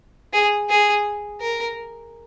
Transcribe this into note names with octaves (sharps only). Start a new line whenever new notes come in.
G#4
G#4
A#4